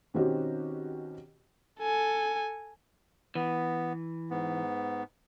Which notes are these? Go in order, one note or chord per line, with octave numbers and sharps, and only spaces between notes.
B2 D#3 C4 C#4 F#4 G4
A4 G#5
E3 B3
G#2 B3